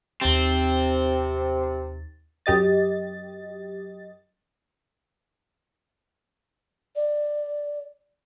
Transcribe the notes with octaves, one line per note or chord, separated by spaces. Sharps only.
D#2 C3 C4 A6
F#2 G4 D#5 A6
D5